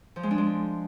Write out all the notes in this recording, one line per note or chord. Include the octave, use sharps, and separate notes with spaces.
F3
G#3
D4
G#3